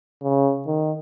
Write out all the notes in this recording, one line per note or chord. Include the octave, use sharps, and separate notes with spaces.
C#3
D#3